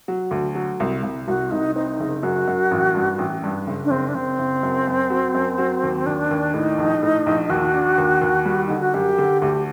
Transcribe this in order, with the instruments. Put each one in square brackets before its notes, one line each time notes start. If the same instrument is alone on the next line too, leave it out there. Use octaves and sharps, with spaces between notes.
[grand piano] F#3
D2
F#3
C2
C2
[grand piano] C2 [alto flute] F#4
[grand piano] C2 [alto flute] D#4
[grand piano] C4 [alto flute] D#4
[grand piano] F#1
[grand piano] F#2 [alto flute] F#4
[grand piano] F#2
A1
G2
A1
G2
F#1
[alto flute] D4
[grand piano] F#1 [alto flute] C4
[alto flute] D4
[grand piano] F#1 [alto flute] C4
[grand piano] F#1
F#2
F#2
F#3
F#2
F#3
D#2
[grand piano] D#2 [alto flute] D4
[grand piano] D#2
[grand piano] A2 [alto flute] D#4
[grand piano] A#1
A2
A#1
[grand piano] D#2 [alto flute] F#4
[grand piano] D4
D#2
D#2
G3
[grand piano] D3 [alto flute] D#4
[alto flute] F#4
[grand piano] F#2 [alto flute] G4
[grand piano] D3
[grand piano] D2 [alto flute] G4